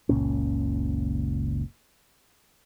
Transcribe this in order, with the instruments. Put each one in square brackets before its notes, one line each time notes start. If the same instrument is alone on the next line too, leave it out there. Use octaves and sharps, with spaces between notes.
[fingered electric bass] F#1 C#2 A#2 C#4